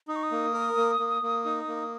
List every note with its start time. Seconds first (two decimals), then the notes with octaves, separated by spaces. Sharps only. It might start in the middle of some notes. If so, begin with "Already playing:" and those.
0.08 D#4 D#6
0.16 C#6
0.23 D#6
0.31 A#3
0.53 A#4
0.77 A#3
0.99 A#3
1.23 A#3
1.45 D#4
1.68 A#3